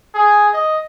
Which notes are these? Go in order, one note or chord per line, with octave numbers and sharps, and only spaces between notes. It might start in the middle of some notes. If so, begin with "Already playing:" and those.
G#4
D#5